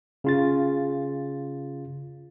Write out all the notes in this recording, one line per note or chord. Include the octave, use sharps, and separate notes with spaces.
C#3 F4 A6